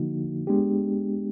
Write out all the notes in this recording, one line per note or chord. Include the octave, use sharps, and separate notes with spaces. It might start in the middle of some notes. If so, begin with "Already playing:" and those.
Already playing: D3 F3 A#3 D#4 F#4
G#3 B3 D4 G4